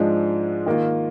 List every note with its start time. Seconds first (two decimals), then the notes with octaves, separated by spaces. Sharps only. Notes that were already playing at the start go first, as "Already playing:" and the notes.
Already playing: G#2 F3 G#3 D4
0.66 D#3 A#3 F4